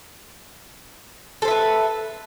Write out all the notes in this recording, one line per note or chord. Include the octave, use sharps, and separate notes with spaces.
A4 B4 C5 E5